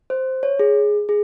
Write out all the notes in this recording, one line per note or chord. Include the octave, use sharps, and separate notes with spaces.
C5
C#5
G#4
G#4